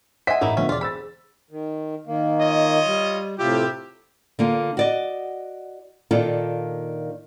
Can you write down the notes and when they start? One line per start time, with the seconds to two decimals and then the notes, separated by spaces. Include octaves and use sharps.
0.27 C5 D#5 E5 F#5 G#5 B6
0.41 A1 A#3 D#4 E4
0.57 D3 F3 B3 C#4
0.69 E1 F4 D5
0.81 G#4 C5 B5 E6 A6
1.51 D#3
2.07 D#3 A#3
2.40 F4 C#5 D#5
2.86 G3
3.39 A2 C3 E4 F4 G4
4.39 D3 A#3 F4
4.77 F#4 D5 D#5
6.11 A#2 D#3 D4 F4 A4